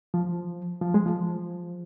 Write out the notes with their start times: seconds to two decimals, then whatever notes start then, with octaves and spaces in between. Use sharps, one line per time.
0.14 F3
0.82 F3
0.94 G#3
1.06 F3